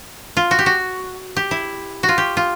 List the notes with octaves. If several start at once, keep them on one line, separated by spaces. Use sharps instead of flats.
F4
F#4
G4
F#4
G4
E4
F#4
F4
G4
F4